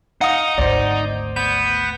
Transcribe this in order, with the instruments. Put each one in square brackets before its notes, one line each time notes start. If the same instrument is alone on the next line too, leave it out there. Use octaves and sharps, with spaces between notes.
[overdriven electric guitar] D#4 [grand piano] F5 D#6 [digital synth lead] F#5
[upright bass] G#1 D2 [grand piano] C5 D5
[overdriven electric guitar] B3 [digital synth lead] G6